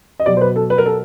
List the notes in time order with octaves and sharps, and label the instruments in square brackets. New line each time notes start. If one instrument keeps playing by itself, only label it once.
[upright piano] D#5
B2 F#3 D5
C5
B4
A4
B4
A#4
A4